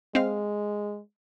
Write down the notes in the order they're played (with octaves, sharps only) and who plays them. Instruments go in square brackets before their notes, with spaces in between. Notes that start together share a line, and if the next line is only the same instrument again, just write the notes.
[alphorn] G#3 [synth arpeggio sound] C4 D#5 F5